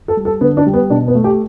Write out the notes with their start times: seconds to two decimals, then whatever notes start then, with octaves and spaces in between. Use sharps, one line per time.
0.08 A4
0.17 G3
0.25 A4
0.41 D3 B3
0.57 D4
0.67 G3
0.74 B3
0.90 B2 D4
1.08 B3
1.15 A3
1.24 G4